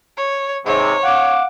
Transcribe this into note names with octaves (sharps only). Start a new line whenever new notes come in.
C#5
G#2 C3 C#5
F5 F#5 D6